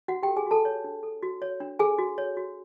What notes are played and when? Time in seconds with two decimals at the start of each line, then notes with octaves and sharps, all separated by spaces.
0.08 D4 F#4 F#5
0.23 G4 A4 G5
0.36 G#4 G#5
0.46 F#4 A4 A5
0.65 C#5
0.84 D4
1.03 A4
1.23 F#4
1.42 C#5
1.60 D4
1.79 G#4 A4 G#5
1.98 F#4
2.18 C#5
2.37 F#4